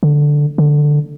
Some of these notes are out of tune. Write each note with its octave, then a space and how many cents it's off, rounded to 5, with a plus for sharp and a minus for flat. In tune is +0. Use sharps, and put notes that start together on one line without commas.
D3 +0
D3 +5